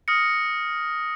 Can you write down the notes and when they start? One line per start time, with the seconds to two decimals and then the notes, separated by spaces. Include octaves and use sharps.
0.08 D#6 F6 A#6 C#7